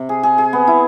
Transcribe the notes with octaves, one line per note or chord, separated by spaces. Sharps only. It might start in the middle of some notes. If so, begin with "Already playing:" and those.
Already playing: C3
G#4
G#4
G#4
B3
E4